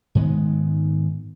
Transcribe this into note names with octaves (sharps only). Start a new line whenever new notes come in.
G#2 D#3 G#3 B3